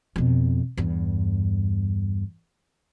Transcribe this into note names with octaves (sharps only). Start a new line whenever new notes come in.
F2 B2
E2 G2